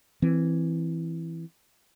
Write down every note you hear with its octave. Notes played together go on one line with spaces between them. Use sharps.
E3 C4